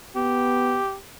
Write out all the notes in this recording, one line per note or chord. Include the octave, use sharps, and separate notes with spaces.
B3 G4